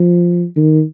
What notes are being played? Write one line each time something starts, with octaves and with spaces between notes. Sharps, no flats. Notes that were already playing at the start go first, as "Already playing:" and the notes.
Already playing: F3
D#3